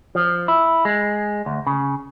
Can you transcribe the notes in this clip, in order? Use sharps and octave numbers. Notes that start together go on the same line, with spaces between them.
F3
E4
G#3
D2
C#3